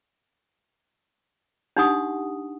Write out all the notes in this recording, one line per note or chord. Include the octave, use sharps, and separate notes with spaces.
D4 D#4 G4 F#5 C6 D#6